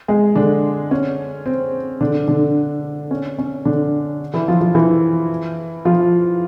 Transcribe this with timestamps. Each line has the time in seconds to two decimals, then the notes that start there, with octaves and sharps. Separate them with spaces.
0.08 G#3 G#4
0.35 D3 D4
0.91 C#4
1.46 C4
2.01 D3 D4
2.28 D3 D4
3.11 C#4
3.39 C#4
3.65 D3 D4
4.34 E3 E4
4.48 F3 F4
4.61 F3 F4
4.75 E3 E4
5.85 F3 F4